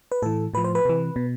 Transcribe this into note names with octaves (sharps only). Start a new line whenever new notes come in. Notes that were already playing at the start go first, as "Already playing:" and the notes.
B4
A2 E3 A4
A2 F3 B4
C5
B4
C3 E3
B2